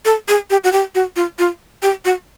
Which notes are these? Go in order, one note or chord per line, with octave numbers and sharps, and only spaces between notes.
A4
G#4
G4
F#4
G4
F#4
F4
F4
G4
F#4